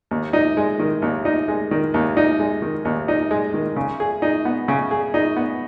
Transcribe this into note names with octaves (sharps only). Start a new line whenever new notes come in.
D#2
D#4
G#3
D#3
D#2
D#4
G#3
D#3
D#2
D#4
G#3
D#3
D#2
D#4
G#3
D#3
C#3
G#4
D#4
B3
C#3
G#4
D#4
B3